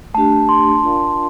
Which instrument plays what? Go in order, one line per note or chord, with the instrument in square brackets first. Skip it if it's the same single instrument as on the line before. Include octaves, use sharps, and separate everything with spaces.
[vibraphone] A3 D4 G4 [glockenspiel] A5
[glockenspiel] C6
[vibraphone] D4 F4 A#4 D5 F5